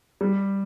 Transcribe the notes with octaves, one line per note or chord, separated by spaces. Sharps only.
G3